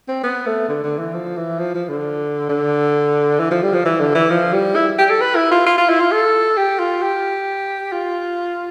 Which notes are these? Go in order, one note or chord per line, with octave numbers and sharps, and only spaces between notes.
C4
B3
A3
D3
D3
E3
F3
E3
F3
F3
D3
D3
E3
F3
G3
F3
E3
D3
E3
F3
G3
E4
G4
A4
B4
E4
F4
F4
F4
E4
F4
A4
G4
F4
G4
F4